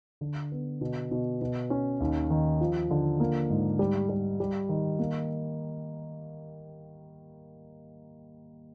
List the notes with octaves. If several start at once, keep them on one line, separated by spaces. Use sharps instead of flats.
D3
B3
B2
B2
B2
C#4
D#2
D#3
F3
D3
A#3
G#2
G3
G3
G3
D#3
A#3